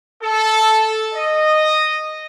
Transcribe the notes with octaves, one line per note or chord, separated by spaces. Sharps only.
A4
D#5